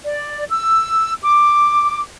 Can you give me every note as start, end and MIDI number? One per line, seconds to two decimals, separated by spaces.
0.04 0.44 74
0.50 1.13 88
1.22 2.00 86